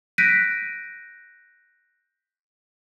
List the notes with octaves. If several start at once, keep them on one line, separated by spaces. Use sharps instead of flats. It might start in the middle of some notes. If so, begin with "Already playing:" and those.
F#6 G6 A#6 B6 D7 D#7